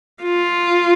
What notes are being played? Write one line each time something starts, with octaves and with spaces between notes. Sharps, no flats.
F4